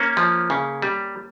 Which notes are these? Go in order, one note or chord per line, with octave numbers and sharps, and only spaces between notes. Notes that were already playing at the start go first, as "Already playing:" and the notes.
Already playing: A#3 C#4
F3
C#3
G3